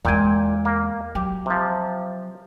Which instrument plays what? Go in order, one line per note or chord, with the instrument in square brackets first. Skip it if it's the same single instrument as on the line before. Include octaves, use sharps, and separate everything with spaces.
[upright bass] E2 G#3 [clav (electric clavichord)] A#2 G5 G#5
[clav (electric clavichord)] A#3
[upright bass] F#3 [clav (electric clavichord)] G4
[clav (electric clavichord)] C3 F3